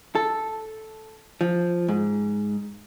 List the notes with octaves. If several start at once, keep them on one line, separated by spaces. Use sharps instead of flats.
A4
F3
G#2